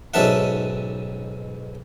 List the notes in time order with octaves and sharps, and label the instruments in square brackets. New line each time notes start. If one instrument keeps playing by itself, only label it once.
[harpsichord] B1 G#2 C#4 A4 E5 F#5